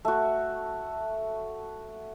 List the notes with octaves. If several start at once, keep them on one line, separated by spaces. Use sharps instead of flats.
A3 F#4